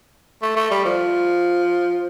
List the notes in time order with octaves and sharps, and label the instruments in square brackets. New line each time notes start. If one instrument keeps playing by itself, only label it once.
[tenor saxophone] A3
A3
G3
F3